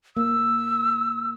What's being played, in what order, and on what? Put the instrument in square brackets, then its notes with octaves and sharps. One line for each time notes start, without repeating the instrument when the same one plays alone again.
[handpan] A#3 [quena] E6